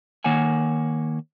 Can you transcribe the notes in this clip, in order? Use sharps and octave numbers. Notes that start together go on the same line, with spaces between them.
D#3 A#3 C#5 F#5 G#5